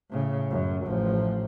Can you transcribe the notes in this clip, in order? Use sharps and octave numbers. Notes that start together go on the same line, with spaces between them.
A2 C#3
F#2
A1 F3